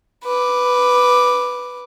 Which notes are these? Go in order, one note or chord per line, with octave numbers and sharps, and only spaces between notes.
B4 D6